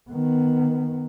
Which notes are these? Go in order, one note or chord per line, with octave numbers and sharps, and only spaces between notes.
D#3 B3